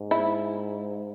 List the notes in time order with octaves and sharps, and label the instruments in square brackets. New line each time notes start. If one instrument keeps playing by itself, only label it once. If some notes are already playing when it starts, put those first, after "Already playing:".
Already playing: [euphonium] G#2
[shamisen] E4